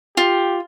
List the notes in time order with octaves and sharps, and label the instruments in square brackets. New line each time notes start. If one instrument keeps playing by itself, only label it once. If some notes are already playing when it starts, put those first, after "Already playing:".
[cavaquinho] F4 [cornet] G4